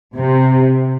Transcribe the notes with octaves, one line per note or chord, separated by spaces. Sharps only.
C3